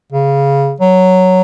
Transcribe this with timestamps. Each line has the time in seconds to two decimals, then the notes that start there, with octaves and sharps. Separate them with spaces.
0.12 C#3
0.81 F#3